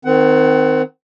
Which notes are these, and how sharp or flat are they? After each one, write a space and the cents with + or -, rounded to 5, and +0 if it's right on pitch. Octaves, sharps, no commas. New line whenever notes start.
D#3 +0 C4 -20 F#5 +20